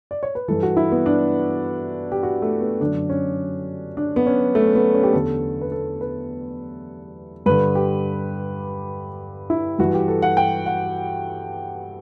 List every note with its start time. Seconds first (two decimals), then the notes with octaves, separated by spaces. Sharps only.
0.11 D5
0.23 C#5
0.35 B4
0.48 G2 E3 A4
0.63 F#4
0.77 E4
0.92 B3
1.06 D4
2.12 G4
2.23 F#4
2.42 A3
2.61 B3
2.81 F#2 D3 D4
3.10 C#4
3.97 D4
4.16 B3
4.26 C#4
4.55 A3
4.66 C#4
4.75 B3
4.94 C#4
5.03 G4
5.13 E2 D3 A4
5.61 B4
5.72 A4
6.01 B4
7.46 G2 D3 B4
7.75 G4
9.50 E4
9.79 G2 E3 F#4
9.94 G4
10.08 A4
10.22 F#5
10.37 G5
10.66 F#5